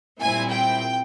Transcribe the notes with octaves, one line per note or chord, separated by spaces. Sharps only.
A#2 G3 C4 E4 G#5
G5